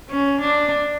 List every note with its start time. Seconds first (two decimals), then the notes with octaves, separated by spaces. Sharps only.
0.10 C#4
0.40 D4